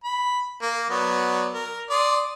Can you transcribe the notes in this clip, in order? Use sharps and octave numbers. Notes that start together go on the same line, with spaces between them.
B5
A#3
F#3 B3 D5
A#4
D5 C6 D#6